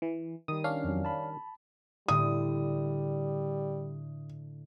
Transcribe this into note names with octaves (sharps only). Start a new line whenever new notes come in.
E3
D#3 G3 D#6
C#4 D4 F5
F2 F#3
A5 B5
A2 D3 G3 D#6